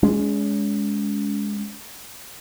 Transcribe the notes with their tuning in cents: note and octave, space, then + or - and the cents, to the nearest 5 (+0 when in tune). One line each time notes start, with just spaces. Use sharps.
G#3 +0 C#4 +35